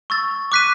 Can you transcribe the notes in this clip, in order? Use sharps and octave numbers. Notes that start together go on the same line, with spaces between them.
C#6 E6 A6
D6 F#6 B6 D#7